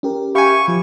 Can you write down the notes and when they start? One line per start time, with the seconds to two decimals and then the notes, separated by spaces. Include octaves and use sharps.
0.03 C#4 G4 A#4
0.35 G4 E5 F5 G#5 B5 C#6
0.68 F3